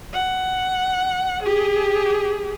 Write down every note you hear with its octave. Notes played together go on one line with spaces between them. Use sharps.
F#5
G4 G#4